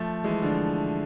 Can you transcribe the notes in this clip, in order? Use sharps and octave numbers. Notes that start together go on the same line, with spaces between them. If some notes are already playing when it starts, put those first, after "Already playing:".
Already playing: F3 A3
E3 G#3
D3 F3